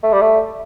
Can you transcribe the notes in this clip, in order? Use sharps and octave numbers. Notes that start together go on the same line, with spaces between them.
A3
G3
A3